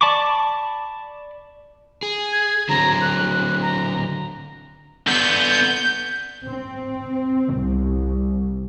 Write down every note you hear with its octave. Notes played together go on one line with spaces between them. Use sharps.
D5 A5 B5 C#6 D6
G#4
G#6
D3 F#3 C4 A#5
F#6
A#5
D3 B3 G6
C4
C2